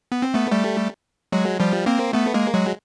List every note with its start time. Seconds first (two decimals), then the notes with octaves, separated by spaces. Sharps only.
0.12 B3
0.22 C4
0.34 A3 B3
0.51 G3 A3
1.32 F#3 G#3
1.60 F3 G3
1.86 A#3 C4
2.13 A3 B3
2.34 G#3 A#3
2.54 F#3 G#3